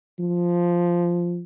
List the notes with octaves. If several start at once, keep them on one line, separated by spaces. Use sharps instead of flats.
F3